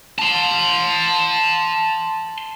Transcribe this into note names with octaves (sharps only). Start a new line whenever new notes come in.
A5 C6